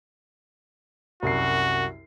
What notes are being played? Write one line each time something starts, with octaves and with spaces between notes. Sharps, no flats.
C2 F#2 F#4 C7